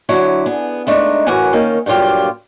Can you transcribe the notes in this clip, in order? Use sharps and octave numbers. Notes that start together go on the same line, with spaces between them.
D3 F#3 E4 C#5
B3 G#4
G#3 A3 D4 D#4
F#2 A2 E3 A#4 F#5 G#5
D#3 A#3 C#4 D#4
G2 A#2 F#3 F4 G4